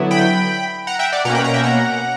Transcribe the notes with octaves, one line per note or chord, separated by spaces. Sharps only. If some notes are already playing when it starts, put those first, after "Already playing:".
Already playing: D3 F#3 B3 E4
G5 B5
F#5 A#5
E5 G5
D5 F#5
B2 A#3 C#4 F#5 A#5
G5 B5
F#5 A#5
E5 G5
F#5 A#5